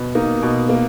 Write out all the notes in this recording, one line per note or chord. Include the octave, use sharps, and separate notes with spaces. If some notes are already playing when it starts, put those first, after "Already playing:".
Already playing: B2
A#3 D#4
B2
A#3